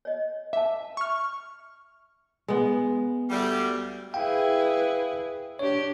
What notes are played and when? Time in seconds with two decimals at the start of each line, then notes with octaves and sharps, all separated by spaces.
0.05 C#5 D#5
0.53 E5 A5 D6
0.97 C#6 F6
2.48 G#3 B3
3.30 D2 G3
4.14 E4 G#4 B4 F5 G5
5.59 D4 G4 C#5